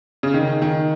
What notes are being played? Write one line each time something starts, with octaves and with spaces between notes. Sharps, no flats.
C#3
D#3
D#3